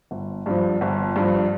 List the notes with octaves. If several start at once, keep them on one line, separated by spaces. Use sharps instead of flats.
G1
G2 F3
G1
G2 F3